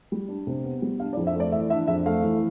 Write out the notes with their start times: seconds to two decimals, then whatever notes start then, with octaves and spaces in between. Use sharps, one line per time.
0.12 G3
0.28 D4
0.47 C3
0.64 B3
0.82 G3
0.99 D4 F5
1.13 D5
1.17 F2
1.27 E5
1.36 A3 D5
1.52 E3 E5
1.70 D4 E5
1.88 F2 E5
2.06 A3 F5
2.23 E3